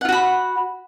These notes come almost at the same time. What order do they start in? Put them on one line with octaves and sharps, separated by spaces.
F#5 F4 F#4 B5